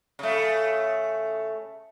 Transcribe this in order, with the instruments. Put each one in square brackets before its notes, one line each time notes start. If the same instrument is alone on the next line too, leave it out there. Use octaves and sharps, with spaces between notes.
[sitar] C#3 A3